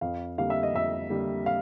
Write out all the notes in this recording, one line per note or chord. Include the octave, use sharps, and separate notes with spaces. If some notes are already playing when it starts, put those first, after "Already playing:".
F2 F5
D3 G3 A#3 F5
E5
D#5
F2 E5
D3 G3 A#3
F5